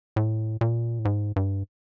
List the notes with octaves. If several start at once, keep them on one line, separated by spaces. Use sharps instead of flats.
A2
A#2
A2
G#2
G2